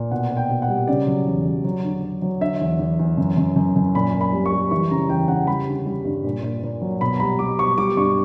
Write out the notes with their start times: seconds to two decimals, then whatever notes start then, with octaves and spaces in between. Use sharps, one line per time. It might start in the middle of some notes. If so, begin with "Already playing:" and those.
Already playing: A#2
0.11 B2 F#5
0.31 B2
0.37 G5
0.50 B2
0.62 F#5
0.68 G3
0.87 C#3 D5
1.07 F#3
1.27 E2
1.45 F#3
1.64 F#3
1.84 D3
2.03 F#3
2.22 F#3
2.41 D3 E5
2.61 E2
2.79 E2
2.99 E2
3.17 F#2
3.37 F#2
3.56 F#2
3.76 F#2
3.95 A#2 B5
4.14 A#2
4.21 B5
4.33 G3
4.46 C#6
4.52 G3
4.71 E3 C#6
4.91 C#3 A#5
5.09 E2 G5
5.28 C#3 F#5
5.47 G3 B5
5.67 D3
5.86 G3
6.05 G2
6.24 A#2
6.43 A#2
6.63 A#2
6.82 F#3
7.01 B2 B5
7.17 A#5
7.20 G3 B5
7.39 G3 D6
7.59 B2 C#6
7.78 G3 D6
7.97 G2 C#6